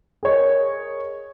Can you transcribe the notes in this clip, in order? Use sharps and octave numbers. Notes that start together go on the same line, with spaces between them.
G#4 A#4 C#5 D#5